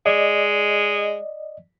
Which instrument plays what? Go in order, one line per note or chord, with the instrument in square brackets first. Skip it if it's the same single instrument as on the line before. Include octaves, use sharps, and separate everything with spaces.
[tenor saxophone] G#3 [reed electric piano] D5 D#5